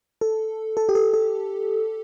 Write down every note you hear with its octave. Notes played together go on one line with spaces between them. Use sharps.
A4
A4
G4
A4
A4